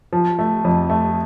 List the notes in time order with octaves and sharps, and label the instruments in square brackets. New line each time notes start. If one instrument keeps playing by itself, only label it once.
[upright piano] F3
A3
F2
A3